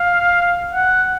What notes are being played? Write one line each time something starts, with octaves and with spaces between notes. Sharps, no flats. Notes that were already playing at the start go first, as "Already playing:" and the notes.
Already playing: F5
F#5